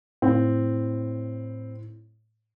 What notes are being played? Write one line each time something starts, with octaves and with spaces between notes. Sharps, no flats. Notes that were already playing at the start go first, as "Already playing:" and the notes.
A2 C4